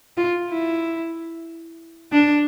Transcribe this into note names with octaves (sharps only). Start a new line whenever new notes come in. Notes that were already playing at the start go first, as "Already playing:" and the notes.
F4
E4
D4